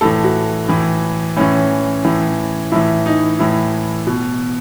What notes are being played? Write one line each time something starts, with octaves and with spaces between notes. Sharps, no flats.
A2 E3 A4
F#4
A2 E3
A2 E3 C#4
A2 E3
A2 E3 E4
D#4
A2 E3 E4
B2